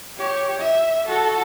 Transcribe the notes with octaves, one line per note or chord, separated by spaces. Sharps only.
G4 C#5
E5
F#4 A4